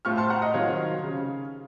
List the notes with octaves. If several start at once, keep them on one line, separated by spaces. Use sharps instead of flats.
A2 A3 C4 F4 C#6 F6
A5 C6
F#5 A#5
D#5 F#5
C3 D#3 F#3 C4 F4 C#5 F5
C#3